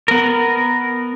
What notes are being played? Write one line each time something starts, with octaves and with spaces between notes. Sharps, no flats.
B3 A#4